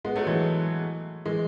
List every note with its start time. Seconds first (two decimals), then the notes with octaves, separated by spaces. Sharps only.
0.04 G#3 B3
0.16 F#3 A3
0.27 E3 G#3
1.25 E3 G#3